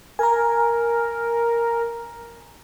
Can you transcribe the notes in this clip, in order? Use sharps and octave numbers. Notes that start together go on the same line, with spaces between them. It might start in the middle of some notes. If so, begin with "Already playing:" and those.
A#4 G#5 A#5